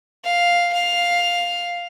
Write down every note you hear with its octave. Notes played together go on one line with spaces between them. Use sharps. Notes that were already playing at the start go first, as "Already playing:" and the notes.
F5
F5